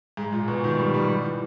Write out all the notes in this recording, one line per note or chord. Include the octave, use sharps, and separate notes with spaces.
G#2
A#2
B2
D#3
G3
G3
G3
E3